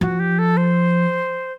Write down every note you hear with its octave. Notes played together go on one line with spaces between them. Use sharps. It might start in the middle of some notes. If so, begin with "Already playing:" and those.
F3 F#4
G4
A4
C5